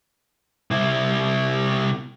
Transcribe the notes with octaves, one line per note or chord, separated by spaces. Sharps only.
C3 E4